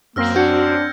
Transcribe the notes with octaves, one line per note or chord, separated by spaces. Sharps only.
F#2 A#3 C4 E6 F6 A#6
D4 F#4 G6 G#6 C#7